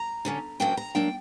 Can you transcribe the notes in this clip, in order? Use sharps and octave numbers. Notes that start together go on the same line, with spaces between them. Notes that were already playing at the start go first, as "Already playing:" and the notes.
Already playing: A#5
D3 F#3 C#4
D2 C#3 F#3 A#3 D4 G5
A#5
F#3 A#3 D4 G5